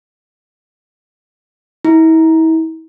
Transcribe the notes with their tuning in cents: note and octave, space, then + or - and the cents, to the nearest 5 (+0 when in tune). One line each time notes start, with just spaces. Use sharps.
E4 -40